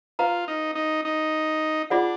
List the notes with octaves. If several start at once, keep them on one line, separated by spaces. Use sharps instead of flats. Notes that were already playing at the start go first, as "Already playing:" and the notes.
F4 B4 F5 A#5
D#4
D#4
D#4
D4 F4 G#4 D5 F#5 B5